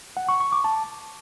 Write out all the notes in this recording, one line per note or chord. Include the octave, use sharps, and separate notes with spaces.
F#5
C#6
C#6
D6
A5